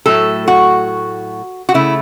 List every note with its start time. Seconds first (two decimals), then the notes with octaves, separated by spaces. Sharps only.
0.06 A2 F#3 A3 A4
0.48 F#4
1.69 F#4
1.74 C#3 A3 E4